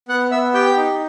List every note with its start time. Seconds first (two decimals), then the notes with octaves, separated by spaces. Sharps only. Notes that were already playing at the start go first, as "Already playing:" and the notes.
0.08 B3 F#5 F#6
0.31 B3 E5 E6
0.54 G4 G5 G6
0.76 D#4